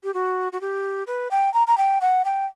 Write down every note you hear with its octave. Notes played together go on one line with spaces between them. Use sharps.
G4
F#4
F#4
G4
B4
G5
A#5
A#5
G5
F#5
G5